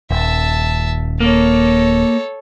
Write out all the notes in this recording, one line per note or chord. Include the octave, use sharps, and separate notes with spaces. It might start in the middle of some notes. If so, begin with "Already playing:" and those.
D#1 E5 A5
A#3 A4 C#5